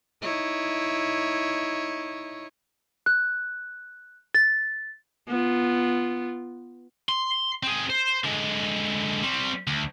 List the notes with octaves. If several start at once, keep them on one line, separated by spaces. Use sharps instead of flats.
D#4 E4 C#5
F#6
A6
B3 F4
C6
C4 G#4
C5
D3 G#3
G3 C4
D2